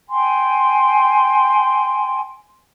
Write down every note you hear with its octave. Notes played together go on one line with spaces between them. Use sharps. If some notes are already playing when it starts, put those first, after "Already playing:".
G5 G#5 C6